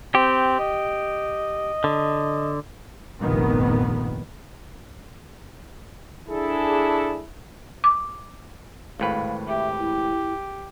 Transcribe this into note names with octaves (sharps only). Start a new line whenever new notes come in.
C4 G4
D#5
D3
F1 A#1 G2 A#2 D#3 B3
D4 E4 G#4 A4
D6
G#1 A2 B4 F5
G4 E5
E4